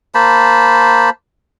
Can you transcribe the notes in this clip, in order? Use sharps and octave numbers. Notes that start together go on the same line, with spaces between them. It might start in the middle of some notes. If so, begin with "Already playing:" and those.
A#3 C5 A5 B5